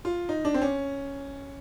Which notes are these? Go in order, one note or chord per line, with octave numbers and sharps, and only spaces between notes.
F4
D#4
D4
C4
C#4